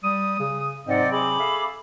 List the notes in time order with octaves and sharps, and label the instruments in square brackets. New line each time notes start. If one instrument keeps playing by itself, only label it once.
[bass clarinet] G3 [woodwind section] D#6
[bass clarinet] C#3
[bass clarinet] G#2 [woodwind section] C3 F#3 C4 [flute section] D5 D#5 F#5
[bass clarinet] G#4 [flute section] B5 D6
[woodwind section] A4 E5 F5